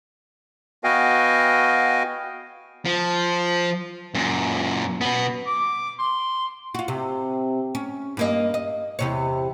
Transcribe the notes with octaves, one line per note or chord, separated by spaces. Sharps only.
B3 F#4 D#5 F5 G5 G#5
F3
F#2 A#2
B2 B3
D6
C6
F4 F#4
C3
C#4
G2 A#3 D#5
D#5
E2 C3 C#5